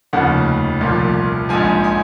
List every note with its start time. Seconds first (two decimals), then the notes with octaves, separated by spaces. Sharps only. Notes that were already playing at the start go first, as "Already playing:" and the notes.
0.13 F1 D#2 C#3 F3 F#5
0.81 C2 A#2 F3
1.49 A#1 G#2 F3 G#5
1.84 G#5